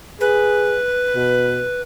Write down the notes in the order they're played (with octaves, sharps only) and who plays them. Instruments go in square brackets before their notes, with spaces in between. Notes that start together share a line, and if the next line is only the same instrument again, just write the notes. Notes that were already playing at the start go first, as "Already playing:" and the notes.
[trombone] G#4 [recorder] B4
[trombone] B2